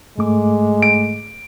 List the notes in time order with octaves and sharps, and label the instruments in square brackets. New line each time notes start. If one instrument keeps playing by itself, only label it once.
[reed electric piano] G#2 A3 D6 [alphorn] G#3
[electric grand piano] D7